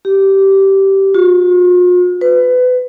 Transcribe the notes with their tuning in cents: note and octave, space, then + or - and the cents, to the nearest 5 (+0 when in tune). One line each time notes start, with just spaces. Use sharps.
G4 -15
F4 +45
B4 +25